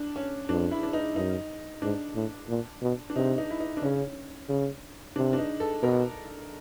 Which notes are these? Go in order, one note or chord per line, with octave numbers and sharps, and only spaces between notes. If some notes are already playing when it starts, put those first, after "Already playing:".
Already playing: D4
C#4
F2 D4
E4
D4
D#4
F#2 D#4
G#2 D4
A2
A#2
B2
D4
C3 D#4
D#4
E4
D#4
D4
C#3 C#4
C#3
C3 D4
D4
D#4
A4
B2 A#4